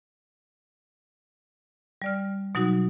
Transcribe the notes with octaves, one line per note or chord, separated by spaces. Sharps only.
G3 D5 F6
B2 F#3 D#4 F#4 D#6